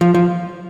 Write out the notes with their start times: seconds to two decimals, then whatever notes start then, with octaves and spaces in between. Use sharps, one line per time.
0.01 F3
0.14 F3